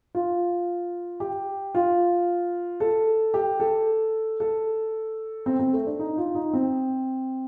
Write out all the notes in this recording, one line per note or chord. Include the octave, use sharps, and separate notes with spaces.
F4
G4
F4
A4
G4
A4
A4
C4
C4
A3
D4
D#4
F4
D#4
C4